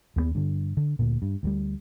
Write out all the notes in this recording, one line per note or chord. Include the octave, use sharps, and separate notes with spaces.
D#2 G#3 B3
G2 D3
D3
D2 A#2
G2
D2 F#3 G3